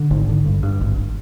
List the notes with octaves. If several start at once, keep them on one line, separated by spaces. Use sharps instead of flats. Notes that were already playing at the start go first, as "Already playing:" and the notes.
Already playing: D3
G#1
D3
G2
G2
G#1